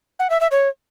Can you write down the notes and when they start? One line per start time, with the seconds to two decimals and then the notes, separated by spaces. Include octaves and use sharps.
0.19 F#5
0.30 E5
0.41 E5
0.51 C#5